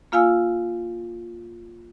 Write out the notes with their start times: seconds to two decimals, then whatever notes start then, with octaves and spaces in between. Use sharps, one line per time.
0.12 A#3 F4 F5 G#5 E6